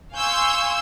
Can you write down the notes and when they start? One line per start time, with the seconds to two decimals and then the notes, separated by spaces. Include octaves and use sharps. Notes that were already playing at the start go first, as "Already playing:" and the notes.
0.16 F5 G#5 C6 C#6 E6 G6